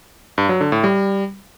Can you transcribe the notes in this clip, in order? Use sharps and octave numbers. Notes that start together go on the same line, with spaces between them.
G2
F#3
D3
A2
G3